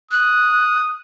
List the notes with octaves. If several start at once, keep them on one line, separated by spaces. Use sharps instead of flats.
D#6 F#6